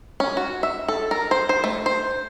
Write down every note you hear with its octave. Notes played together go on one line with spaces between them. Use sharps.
C#4
F#4
E5
A4
A#4
C5
C5
A3
C5